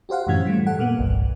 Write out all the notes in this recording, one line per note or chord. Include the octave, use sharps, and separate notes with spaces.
F#4 G4 C5 F5 F#5
F#2 A2 D3 E3 C#4 G#6
E3 G3 A3
A4 F#5
A#2 A#3 B3
G1 C2 G2